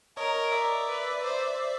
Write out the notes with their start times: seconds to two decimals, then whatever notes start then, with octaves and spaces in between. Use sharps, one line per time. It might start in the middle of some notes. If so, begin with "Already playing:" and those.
0.17 A#4 C#5 D#5
0.52 D5 E5
0.88 B4
1.23 C5